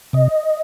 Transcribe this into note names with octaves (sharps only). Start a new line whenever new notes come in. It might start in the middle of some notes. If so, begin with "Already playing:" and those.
C3 D#5